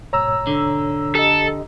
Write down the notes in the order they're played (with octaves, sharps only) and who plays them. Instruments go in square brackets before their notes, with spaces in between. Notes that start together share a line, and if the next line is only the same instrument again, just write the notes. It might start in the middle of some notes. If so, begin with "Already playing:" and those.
[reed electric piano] G#2 B2 C#5 [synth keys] A#5 E6
[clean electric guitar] D3
[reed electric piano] G4 D#5 [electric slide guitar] A4